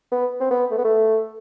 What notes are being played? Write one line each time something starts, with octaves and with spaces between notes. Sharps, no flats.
B3
C4
B3
A3
B3
A3